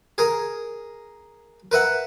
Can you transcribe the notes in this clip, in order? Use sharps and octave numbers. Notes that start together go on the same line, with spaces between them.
G#4 A#4 A#5
A#4 B4 E5 F#5